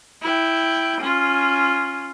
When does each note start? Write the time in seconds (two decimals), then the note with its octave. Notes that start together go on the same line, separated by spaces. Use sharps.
0.22 E4 G5
1.01 C#4 F4